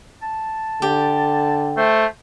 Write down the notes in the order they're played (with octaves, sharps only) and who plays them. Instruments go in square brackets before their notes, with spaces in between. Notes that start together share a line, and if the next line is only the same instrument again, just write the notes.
[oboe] A5
[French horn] D3 [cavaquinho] G4
[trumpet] A3 [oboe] C5